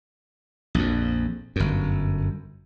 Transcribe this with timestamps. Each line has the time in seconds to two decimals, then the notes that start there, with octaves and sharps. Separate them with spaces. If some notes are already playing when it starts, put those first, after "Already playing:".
0.75 A#1 F2
1.56 G1 F#2